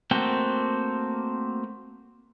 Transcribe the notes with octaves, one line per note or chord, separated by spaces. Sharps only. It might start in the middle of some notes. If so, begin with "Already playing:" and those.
A3 A#3 C4 F#4 G5